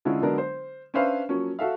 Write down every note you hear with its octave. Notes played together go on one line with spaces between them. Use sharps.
D3 G#3 C#4 E4 F4
D3 F#3 G#3 B3 D4 A#4
C5
C#4 D4 B4 C5 E5 F5
F3 F#3 A#3 C#4
F#4 A4 E5 F5